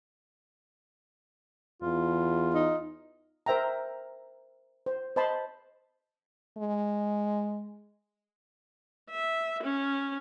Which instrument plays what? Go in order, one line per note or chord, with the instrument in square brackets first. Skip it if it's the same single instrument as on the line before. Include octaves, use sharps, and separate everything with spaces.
[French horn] E2 [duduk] F4
[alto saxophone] D#4
[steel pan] A#4 C5 E5 G5 A#5
C5
C5 D#5 A5 B5 C6
[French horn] G#3
[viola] E5
C#4